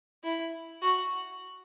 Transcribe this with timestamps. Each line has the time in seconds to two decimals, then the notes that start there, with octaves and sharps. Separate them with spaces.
0.24 E4
0.82 F#4